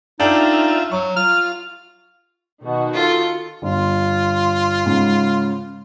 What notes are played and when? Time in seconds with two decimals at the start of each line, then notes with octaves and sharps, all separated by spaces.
0.20 D4 D#4 F4 A4 E5 G5
0.92 F#3 C#6
1.16 F4 F6
2.63 B2 D#3 F#4
2.94 F4 A4
3.62 G1 F4
4.86 G#2 C#3